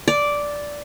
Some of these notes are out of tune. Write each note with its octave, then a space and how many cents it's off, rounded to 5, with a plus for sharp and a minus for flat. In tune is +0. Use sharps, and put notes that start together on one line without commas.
D5 -5